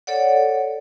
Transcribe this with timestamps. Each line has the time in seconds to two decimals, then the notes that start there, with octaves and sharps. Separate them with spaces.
0.07 A4 C#5 D5 F#5